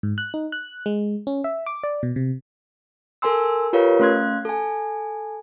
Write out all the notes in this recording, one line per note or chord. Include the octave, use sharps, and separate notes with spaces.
G#2
F#6
D#4
F#6
G#3
C#4
E5
D6
D5
B2
C3
A4 A#4 G#5 C6 E6
F4 G4 A#4 B4 C#5 F5
A3 C#4 F5 C6 F#6 G#6
A4 G#5